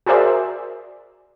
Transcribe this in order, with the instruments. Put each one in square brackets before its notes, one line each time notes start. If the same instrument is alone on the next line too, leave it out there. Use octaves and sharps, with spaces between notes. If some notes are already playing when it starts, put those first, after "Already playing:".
[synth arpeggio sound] F#4 G#4 A#4 C5 D5 E5